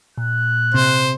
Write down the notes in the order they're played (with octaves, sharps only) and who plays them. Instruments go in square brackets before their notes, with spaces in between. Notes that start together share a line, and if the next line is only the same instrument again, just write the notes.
[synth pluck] A#2 [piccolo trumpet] F#6
[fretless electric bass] C3 [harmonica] C5